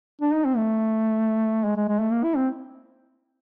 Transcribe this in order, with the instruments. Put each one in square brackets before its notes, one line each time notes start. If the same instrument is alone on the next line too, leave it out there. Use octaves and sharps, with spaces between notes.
[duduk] D4
D#4
C4
A3
G#3
G#3
G#3
A3
A#3
E4
C4